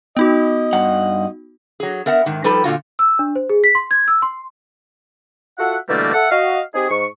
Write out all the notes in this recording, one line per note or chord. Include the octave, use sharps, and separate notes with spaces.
B3 D#4 F#4 D#5
G2 F#5
F#3 G#4
B3 A#4 E5 F#5
G#2 D#3
F3 G3 D#4 G4 A4 B4
A#2 D3 F4 F#4
E6
D4
C5
G#4
B6
C6
G#6
E6
C6
F4 F#4 A4 E5 F#5
B2 D3 E3 G3 A3 A#3
A4 E5 F#5
F#4 D#5 F5
C4 D#4 G4 G#4
G#2 C#6